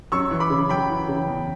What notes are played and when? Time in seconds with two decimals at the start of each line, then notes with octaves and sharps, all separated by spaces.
0.12 F#2 C#6 E6
0.31 E3
0.40 B5 D6
0.50 C#3
0.69 F#2 G5 B5
0.90 E3
1.08 C#3
1.28 E2